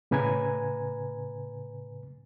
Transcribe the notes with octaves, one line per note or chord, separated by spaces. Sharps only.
A2 C#3 B4 G#5 A#5 G#6